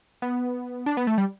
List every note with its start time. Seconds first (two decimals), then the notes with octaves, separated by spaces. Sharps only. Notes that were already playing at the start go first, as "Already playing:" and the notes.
0.22 B3
0.86 D4
0.97 B3
1.07 A3
1.18 G3